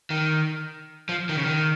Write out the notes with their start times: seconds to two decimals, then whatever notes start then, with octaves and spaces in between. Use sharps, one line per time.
0.10 D#3
1.09 F3
1.29 D#3
1.36 C#3
1.43 D#3